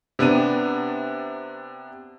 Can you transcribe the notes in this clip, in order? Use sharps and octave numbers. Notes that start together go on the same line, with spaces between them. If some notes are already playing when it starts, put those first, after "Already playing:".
C3 B3 D4 D#7